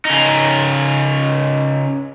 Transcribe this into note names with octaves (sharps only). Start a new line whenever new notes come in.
C#3 D#4